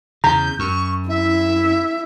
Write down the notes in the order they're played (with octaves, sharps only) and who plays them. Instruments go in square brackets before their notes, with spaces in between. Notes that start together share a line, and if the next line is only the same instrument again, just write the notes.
[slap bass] E2 C#3 [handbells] A#5 [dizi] G6
[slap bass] F#2 [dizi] C#6
[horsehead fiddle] E4 [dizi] E5